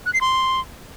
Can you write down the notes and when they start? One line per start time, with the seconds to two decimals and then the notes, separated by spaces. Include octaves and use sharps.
0.06 F#6
0.14 C7
0.21 C6